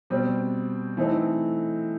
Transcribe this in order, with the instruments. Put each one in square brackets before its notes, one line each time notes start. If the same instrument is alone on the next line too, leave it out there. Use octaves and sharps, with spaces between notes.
[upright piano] B2 G3 C4
E3 A3 C4 D#4 A4